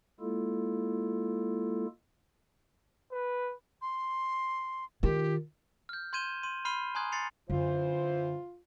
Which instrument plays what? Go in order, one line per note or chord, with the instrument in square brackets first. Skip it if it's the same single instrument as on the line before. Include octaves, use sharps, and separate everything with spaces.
[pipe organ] G#3 A#3 E4 F4 A4
[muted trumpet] B4
[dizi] C6
[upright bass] D#3 F4 [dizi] G4
[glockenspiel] F6 G6
C6 G6 G#6 D#7 E7 G7
C6 D#7
B5 C6 F6 C7 D#7 G7
G#5 A#5 C6 D#6 F#6 G#6
C6 A6 C7 C#7 F7
[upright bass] F#2 D3 [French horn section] E3 C5 [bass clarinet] F4